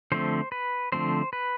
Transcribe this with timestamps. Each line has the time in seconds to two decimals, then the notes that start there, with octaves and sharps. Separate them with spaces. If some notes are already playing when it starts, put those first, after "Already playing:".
0.12 D3 F3 A3 C4 C5
0.52 B4
0.92 D3 F3 A3 C4 C5
1.33 B4